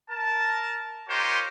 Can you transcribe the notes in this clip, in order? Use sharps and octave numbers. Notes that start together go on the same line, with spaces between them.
A#4 A5
D#4 F4 G4 A#4 C5 C#5